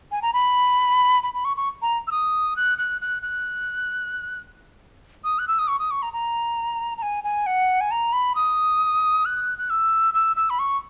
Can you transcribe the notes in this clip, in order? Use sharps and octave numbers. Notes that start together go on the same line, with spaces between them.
G#5
A#5
B5
B5
B5
C#6
C#6
A#5
E6
D#6
F#6
F#6
F#6
F#6
D#6
F#6
E6
D#6
C#6
D#6
C#6
A#5
A#5
A#5
G#5
G#5
F#5
G#5
A#5
B5
D#6
F#6
F#6
E6
E6
E6
B5
C#6